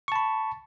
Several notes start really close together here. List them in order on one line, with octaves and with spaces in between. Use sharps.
C#6 A5 B5